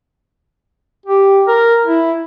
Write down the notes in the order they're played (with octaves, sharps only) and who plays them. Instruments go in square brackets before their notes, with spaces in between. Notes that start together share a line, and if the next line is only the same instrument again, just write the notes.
[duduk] G4
A#4
E4